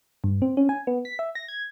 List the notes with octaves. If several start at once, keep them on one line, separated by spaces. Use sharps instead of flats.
G2
C4
C#4
G#5
B3
B6
E5
A#6
G#6